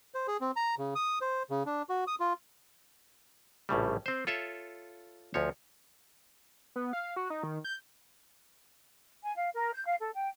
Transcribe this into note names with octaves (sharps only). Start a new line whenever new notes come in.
C5
G#4
C4
A#5
C#3
D#6
C5
C#3
D4
F#4
D#6
F4
A#1 A2 C#3 G3
C4 C5
F4 A4 C#5 E5
D2 F3 C#5
B3
F5
F#4
D#4
D#3
G6
G#5
F5
A#4
G6
F5
A4
G5